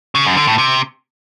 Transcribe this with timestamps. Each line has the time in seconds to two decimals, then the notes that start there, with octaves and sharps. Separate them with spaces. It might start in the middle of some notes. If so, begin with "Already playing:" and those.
0.15 C#3
0.26 F#2
0.36 D3
0.47 A2
0.58 C3